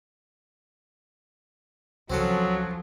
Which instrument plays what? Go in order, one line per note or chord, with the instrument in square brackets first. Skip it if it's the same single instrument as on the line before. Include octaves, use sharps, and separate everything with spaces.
[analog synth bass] C#2 [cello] F3 [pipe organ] F#3 [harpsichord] C4 C#4 A4